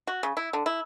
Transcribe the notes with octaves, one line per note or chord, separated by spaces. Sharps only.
F#4
C#3
E4
D3
E4